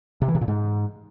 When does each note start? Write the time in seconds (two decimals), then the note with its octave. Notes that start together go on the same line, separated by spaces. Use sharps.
0.22 C3
0.28 E3
0.35 C3
0.41 A#2
0.48 G#2